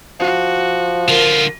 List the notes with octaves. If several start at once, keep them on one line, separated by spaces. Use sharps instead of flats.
F3 F#4
D3 F4 A#4